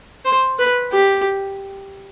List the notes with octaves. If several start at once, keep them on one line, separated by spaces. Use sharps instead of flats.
C5
B4
G4